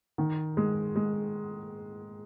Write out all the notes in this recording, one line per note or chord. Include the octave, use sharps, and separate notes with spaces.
D#3
G#3
G#3